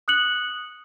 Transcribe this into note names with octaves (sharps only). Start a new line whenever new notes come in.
D#6 F#6 C#7 F#7